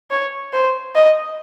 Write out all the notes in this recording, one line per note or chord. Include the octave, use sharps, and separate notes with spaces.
C#5
C5
D#5